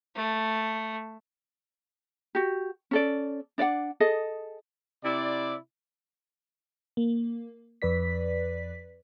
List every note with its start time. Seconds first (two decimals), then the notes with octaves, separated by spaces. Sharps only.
0.16 A3
2.35 F#4 G4
2.91 C#4 A4 D5
3.58 D4 D5 D#5 F#5
4.00 G#4 A4 D#5
5.04 C3 E4 D5
6.97 A#3
7.82 F2 B4 D5 B6